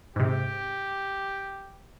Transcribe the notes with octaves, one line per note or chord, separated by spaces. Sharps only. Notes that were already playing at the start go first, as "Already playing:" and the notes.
G#2 C3 G4